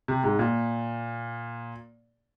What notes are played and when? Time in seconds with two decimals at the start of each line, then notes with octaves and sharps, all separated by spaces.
0.08 C3
0.24 G#2
0.39 A#2